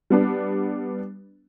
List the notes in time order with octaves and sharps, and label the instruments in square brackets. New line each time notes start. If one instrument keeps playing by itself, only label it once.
[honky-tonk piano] G3 B3 D4